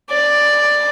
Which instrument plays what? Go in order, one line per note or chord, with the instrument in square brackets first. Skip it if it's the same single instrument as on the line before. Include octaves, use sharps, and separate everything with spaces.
[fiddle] D5